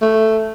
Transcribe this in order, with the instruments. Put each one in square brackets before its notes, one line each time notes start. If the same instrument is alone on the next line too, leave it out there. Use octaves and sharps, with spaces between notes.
[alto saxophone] A3